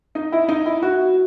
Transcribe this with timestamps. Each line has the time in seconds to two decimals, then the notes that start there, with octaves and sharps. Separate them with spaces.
0.15 D#4
0.32 E4
0.49 D#4
0.66 E4
0.82 F#4